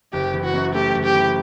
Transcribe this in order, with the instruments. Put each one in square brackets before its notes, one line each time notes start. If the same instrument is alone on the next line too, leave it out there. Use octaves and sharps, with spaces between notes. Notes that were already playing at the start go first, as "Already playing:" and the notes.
[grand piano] F#1 [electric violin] G4
[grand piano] E3
[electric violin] F#4
[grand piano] F#2
[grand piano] A3 [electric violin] G4
[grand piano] F#1
[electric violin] G4
[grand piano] E3